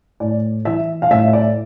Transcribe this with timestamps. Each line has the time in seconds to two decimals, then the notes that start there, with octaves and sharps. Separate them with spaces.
0.20 A2 D5
0.65 E3 E5
1.02 F5
1.11 A2 E5
1.28 E5
1.33 D5